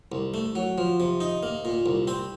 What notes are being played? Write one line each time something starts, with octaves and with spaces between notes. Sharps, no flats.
C2
A3
F#3
F3
C3
D#4
A#3
A#2
C2
C4